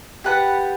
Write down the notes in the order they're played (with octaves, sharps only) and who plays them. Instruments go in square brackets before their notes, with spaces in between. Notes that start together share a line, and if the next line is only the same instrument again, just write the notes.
[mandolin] G4 B4 F#5 A5